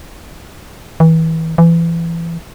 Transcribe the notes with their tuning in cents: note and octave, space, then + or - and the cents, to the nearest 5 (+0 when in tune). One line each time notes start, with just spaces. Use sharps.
E3 -30
E3 +25